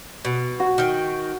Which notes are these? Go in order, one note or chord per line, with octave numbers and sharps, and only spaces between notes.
B2
F#4
D#3 G5